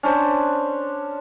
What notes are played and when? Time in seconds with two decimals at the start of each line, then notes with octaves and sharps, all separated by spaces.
0.03 C#4 D4 C5